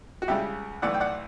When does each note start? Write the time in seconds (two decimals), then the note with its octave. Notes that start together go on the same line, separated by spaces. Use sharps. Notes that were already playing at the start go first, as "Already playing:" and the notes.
0.22 F#4
0.28 C#2 C#3 G3 E4 G4
0.82 B1 A2 E3 D5 F#5
0.94 G5
1.00 D5 F#5